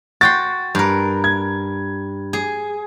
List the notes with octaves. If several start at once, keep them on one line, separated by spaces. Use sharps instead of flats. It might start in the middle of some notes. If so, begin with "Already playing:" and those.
F#4 G5 C6 A6
G2 A#4
G#6
G#4